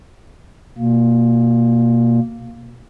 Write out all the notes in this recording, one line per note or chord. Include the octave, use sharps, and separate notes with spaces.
B2 A#3